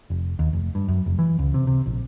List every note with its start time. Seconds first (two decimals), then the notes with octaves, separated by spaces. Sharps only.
0.10 F1
0.39 D#2
0.53 F1
0.75 G2
0.88 F#2
1.06 F1
1.19 E3
1.39 C#2
1.54 C3
1.67 C3
1.86 A#1